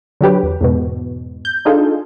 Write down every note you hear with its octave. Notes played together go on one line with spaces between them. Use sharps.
D3 F#3 G4 B4
E2
E2 G#2 B2
G6
D4 D#4 F4 G#4 A4